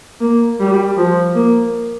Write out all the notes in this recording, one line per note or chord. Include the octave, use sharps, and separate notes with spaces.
A#3
G3
F3
A#3